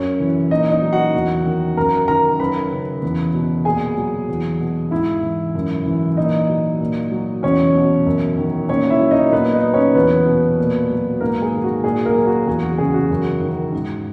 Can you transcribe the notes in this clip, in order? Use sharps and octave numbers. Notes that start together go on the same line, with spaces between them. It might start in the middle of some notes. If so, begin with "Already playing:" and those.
Already playing: F#2 F#3 C#4 C#5
E3
A#2 D#4 D#5
D#4 D#5
F#3
F#4 F#5
E2
D#3
F#2 A#4 A#5
D#3 A#4 A#5
F#2 B4 B5
C#3
E2
B2
A#2 G#4 G#5
F#3
E2
B2
G#2 E4 E5
E3
F#2
E3
A#2 D#4 D#5
F#3
A#2
F#3
E2 C#4 C#5
B2
F#2
D#3
A#2 C#4 C#5
E4 E5
F#3
D#4 D#5
A#2 B3 B4
D#4 D#5
F#3
C#4 C#5
E2 B3 B4
B2
A#2
F#3
G#2 A#3 A#4
G#4
D#3
F#4
A#2 G#4
A#3 A#4
F#3
F#4
E2 G#4
F#4
C#3 G#4
F#4
F#2
D#3
G#2